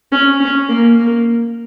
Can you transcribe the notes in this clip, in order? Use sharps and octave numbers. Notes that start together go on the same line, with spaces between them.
C#4
C#4
A#3
A#3